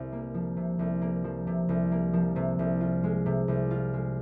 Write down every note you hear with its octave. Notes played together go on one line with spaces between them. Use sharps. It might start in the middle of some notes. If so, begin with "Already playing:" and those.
Already playing: C2 C3
A#3
F3
C3
C2
A#3
F3
C3
C2
A#3
F3
C3
C2
F4
G#3
C3
C2
F4
G#3